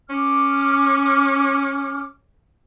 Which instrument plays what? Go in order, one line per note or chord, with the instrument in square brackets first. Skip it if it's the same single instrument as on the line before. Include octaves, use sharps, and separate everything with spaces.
[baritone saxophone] C#4 [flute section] D6 F6